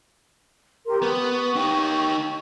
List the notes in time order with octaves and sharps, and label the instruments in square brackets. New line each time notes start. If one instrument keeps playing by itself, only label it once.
[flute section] G4 A#4 C6
[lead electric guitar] B3 [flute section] C#6
[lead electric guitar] D#4 G4